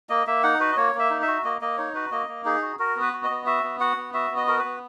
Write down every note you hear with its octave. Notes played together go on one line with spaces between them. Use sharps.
A#3 D#5
A#3 E5
D#4 F#5
F#4 B4
D#5
A#3 C#5
A#3 E5
D#4
E5
F#4
A#3 D#5
A#3 D#5
D#4 C#5
F#4 B4
A#3 D#5
A#3
D#4 G#4
F#4
F#4 A#4
B3
B4
F#4
D#5
B3
F#4 E5
B3
F#4 F#5
B3
F#4 E5
B3
D#5
F#4 A#4
B4
B3